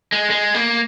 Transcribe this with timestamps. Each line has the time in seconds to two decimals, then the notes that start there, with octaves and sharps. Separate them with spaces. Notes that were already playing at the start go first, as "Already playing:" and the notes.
0.12 G#3
0.30 G#3
0.54 A#3